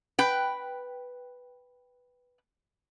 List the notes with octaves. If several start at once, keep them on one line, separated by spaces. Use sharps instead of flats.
B4 G5